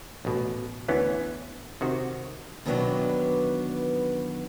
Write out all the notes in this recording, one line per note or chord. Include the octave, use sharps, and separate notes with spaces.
A1 B2
D2 E3 B3 C#4
C3 D#3 F#4
B2 D#3 E3 F#3 B3 D4